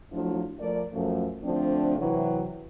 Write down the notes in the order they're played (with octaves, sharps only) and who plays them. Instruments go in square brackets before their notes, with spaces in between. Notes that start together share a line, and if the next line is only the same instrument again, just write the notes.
[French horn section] F3 F#3 A3 D4 E4 F4
F3 A3 A#4 D5
F#2 F3 A3
D3 F3 A3 C4 D4
C3 E3 F#3